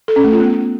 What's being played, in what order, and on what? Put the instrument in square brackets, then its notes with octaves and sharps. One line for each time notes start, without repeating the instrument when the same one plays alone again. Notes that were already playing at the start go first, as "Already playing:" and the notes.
[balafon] A4
C#4
A3
F4
B3